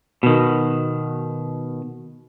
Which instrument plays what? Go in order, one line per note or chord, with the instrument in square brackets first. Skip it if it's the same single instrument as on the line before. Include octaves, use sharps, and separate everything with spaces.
[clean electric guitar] B2 D#3